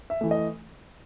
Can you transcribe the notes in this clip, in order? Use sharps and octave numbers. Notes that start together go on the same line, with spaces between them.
E5
E3 A3
D#5